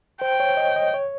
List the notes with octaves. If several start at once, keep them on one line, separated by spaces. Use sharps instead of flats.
C5 G5
C#5
D#5
D#5
C#5